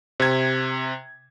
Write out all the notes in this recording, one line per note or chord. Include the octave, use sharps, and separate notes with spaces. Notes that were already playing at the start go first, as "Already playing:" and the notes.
C3 G#6